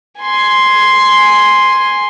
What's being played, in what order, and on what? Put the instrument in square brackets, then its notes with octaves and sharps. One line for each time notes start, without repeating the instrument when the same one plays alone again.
[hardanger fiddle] G#5 C6